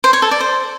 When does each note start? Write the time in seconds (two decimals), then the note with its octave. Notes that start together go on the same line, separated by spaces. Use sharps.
0.04 C5
0.13 C#5
0.22 A4
0.31 D5
0.40 C5